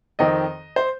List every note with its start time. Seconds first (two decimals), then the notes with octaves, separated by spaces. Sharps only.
0.19 F2 D#3 C4 D#5
0.76 C5